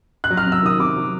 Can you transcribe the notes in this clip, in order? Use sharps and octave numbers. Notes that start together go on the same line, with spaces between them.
F#6
F#3
F6
C3
E6
D#3 D#6
C3 D6
F#3